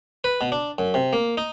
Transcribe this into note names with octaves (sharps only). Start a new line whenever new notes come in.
B4
B2
D4
F#2
C3
A#3
D#4